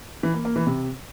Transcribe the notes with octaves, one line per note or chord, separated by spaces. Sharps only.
E3
A#3
A#3
E3
C3